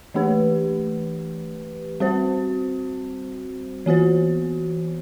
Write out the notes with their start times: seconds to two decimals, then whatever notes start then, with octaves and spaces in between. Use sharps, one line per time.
0.14 E3 A3 D4 G4 B4
2.00 G3 C4 F#4 C5
3.86 E3 B3 F#4 C5